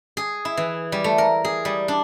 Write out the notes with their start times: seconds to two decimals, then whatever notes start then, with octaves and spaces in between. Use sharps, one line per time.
0.17 G#4
0.45 E4
0.57 E3
0.92 G3
1.04 A3
1.18 A#4
1.45 G#4
1.65 G3
1.88 D4